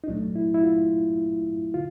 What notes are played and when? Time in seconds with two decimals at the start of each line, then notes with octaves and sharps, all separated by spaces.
0.04 D#4
0.08 C2 A#2 F#3 A3 D4
0.35 E4
0.54 E4
0.63 F4
1.74 D3 F4